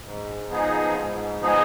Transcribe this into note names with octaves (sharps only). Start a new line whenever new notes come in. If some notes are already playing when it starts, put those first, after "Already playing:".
G#2
F3 B3 D#4 G#4
G#2
F3 B3 D#4 G#4